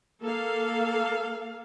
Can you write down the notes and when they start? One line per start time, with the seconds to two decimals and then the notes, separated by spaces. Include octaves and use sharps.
0.22 A#3 A4 F5